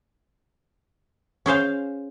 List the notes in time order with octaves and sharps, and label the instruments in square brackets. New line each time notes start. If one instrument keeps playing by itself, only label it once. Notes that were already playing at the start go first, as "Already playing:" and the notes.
[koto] C#4 G#4 C5 F5